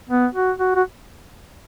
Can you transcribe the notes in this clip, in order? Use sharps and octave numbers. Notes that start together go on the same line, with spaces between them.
B3
F#4
F#4
F#4